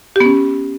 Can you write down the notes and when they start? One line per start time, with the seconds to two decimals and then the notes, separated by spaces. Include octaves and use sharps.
0.16 G4
0.20 B3
0.25 C#4